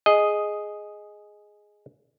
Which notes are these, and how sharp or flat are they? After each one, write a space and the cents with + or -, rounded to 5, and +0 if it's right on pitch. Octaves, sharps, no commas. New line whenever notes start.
G#4 +5 D#5 +0